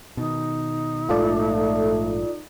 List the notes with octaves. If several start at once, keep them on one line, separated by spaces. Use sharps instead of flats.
B2 D#3 D#4
A#1 G#2 A3 F4 A4 D5